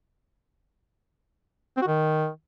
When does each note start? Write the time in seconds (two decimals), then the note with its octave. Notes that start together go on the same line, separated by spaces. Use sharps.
1.77 C4
1.82 F#4
1.87 D#3